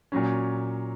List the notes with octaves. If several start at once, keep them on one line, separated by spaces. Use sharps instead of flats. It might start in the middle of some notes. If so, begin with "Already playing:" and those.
A#2 F#3 C#4